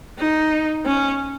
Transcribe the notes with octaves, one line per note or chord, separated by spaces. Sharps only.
D#4
C#4